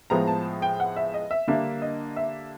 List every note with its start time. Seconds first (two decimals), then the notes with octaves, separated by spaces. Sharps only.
0.10 A2 F3 G#3 B3 A#5
0.27 A5
0.62 G5
0.80 F#5
0.96 E5
1.14 D#5
1.31 E5
1.47 D3 G3 A#3 D4 E5
1.82 D#5
2.16 E5